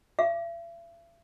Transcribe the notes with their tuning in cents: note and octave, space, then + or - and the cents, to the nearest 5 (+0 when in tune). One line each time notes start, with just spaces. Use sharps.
E5 +45